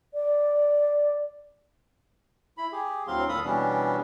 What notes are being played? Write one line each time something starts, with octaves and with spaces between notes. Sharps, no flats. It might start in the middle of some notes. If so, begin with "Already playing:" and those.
D5
E4 B5
G4 G#4
D2 A2 F#3 C4 F5 C6
D#2 A#2 A4 F5 B5 D#6
B2 E3 G3 B3 C#4 D4